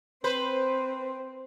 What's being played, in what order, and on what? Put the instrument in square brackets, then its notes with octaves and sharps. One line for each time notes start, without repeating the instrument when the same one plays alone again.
[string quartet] C4 [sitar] B4 C5